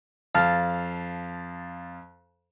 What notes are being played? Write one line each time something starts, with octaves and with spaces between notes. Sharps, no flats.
F2 F5 A5 F6